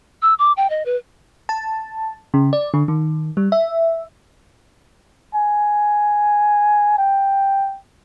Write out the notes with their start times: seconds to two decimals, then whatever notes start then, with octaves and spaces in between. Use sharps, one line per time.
0.22 E6
0.39 D6
0.57 G5
0.70 D#5
0.86 B4
1.49 A5
2.34 C#3
2.53 D5
2.74 D3
2.88 D#3
3.37 G3
3.52 E5
5.35 G#5
6.98 G5